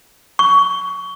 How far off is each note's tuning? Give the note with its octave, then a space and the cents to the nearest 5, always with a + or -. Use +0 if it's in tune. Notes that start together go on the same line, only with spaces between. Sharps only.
C#6 +25